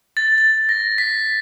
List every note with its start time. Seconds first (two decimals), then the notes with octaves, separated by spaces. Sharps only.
0.17 A6
0.38 A6
0.69 A#6
0.98 B6